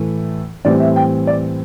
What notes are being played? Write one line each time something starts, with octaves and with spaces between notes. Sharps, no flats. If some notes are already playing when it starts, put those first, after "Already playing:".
Already playing: A2 E3 A3
A2 E3 G3 C4 D5
E5
G5
D5